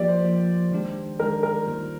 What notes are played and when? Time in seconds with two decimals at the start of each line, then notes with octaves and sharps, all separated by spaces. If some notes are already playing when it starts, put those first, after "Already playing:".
Already playing: F3 A#3 F4 G4 D5
0.08 C5
0.24 F3 A#3 F4
0.72 D#3 G#3 D4 G4
1.20 D#3 G#3 D4 G4 A#4
1.43 A#4
1.67 D#3 G3 A#3 F4